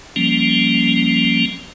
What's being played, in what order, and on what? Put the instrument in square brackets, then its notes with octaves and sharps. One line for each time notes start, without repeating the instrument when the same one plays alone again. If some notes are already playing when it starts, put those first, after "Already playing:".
[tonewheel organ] F3 G3 A#3 C#4